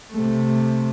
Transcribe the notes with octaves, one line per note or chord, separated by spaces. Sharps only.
C3 A3